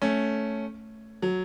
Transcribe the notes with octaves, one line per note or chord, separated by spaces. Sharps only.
A3 C#4
F#3